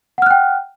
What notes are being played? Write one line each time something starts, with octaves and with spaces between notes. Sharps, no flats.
F#5 G5 F6 F#6